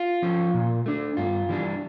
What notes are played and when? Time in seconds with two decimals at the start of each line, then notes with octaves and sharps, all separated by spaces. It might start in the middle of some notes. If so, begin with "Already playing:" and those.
Already playing: F4
0.22 F3 C#4
0.54 A#2
0.86 A3 D4
1.17 G2 F4
1.49 E3 G3 D4